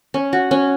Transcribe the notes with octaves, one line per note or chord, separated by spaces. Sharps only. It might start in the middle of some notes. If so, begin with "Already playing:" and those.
C#4
F#4
C#4